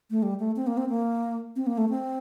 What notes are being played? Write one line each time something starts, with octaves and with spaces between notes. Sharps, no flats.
A3
G3
A3
C4
A#3
C4
A#3
C4
A#3
A3
C4